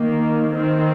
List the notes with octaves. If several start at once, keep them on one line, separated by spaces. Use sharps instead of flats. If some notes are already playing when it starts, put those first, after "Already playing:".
Already playing: D#3 A#3
D#3 C4